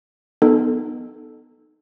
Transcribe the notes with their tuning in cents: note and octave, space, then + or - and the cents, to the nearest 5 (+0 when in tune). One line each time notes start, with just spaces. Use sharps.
B3 +0 D#4 -25 A4 -5